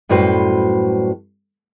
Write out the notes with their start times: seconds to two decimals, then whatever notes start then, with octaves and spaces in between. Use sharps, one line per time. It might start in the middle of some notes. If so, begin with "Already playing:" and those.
0.09 F#2 A2 G3 F#4 B4 C5